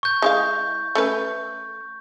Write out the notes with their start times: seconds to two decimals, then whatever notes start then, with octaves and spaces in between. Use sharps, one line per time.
0.03 C#6 G6
0.22 G#3 E4 F5
0.95 A3 C#4 B4